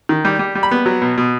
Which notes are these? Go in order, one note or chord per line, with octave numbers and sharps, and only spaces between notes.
D#3
G3
G3
G3
B5
B3
F#3
B2
B2